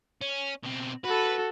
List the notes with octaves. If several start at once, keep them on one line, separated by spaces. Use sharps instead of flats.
C#4
B2 C4
F#4 A4 B4